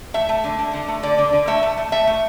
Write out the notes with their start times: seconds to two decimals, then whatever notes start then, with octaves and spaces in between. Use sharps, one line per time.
0.14 A3 E5
0.29 A3
0.44 D3
0.59 D3
0.73 D3
0.88 A3
1.03 D3 D5
1.18 D3
1.33 D3
1.47 A3 E5
1.63 A3
1.78 A3
1.92 A3 E5
2.07 A3